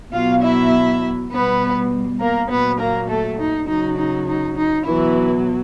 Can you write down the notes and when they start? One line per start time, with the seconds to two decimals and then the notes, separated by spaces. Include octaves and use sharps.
0.13 B2 F#3 F4 F5
0.42 E4 E5
1.31 B2 G3 B3 B4
2.20 A#3 A#4
2.49 A#2 F#3 B3 B4
2.79 A#3 A#4
3.08 A3 A4
3.39 D#4
3.68 C#3 F#3 D#4
3.97 D#4
4.28 D#4
4.56 D#4
4.86 B2 E3 F#3 E4